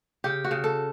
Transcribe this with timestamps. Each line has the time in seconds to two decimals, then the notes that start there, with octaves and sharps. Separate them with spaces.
0.24 C#3 G4
0.45 F#4
0.51 C#3
0.64 A4